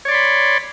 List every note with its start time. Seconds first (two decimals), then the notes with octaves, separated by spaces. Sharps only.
0.05 C#5
0.08 D5
0.11 C6
0.14 B5